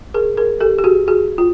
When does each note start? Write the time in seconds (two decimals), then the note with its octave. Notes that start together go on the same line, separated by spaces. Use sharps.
0.14 G#4 A#4
0.37 G#4 A#4
0.60 G4 A4
0.78 G4
0.84 F#4 G#4
1.08 F#4 G#4
1.38 F4